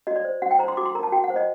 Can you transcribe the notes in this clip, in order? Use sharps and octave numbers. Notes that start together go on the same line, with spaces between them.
F#4 D#5
D5
C5
F#4 F#5
G5
C5 A#5
C6
F#4 D6
C6
A#4 A#5
A5
F#4 G5
F#5
C5
D#5